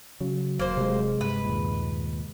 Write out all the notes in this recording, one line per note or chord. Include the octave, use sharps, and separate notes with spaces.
C#3 F#3
E1 A#3 C5
C3 G#3
G2 G#3 B4
D#2 A#2